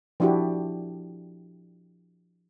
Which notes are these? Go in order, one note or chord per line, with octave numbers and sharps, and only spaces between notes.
F3 D4 E4 F#4 G4